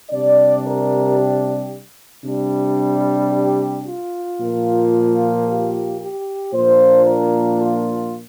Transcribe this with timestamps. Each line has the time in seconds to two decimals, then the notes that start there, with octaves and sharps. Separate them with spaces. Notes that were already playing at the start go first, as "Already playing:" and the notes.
0.10 C3 G3 D4 D5
0.65 A#4
1.18 G4
2.24 C3 G3 D4
3.31 G4
3.85 F4
4.38 A#2 F3 A#3
5.46 G4
5.99 G4
6.52 A#2 F3 A#3 D4 C5
7.05 A#4
7.59 F4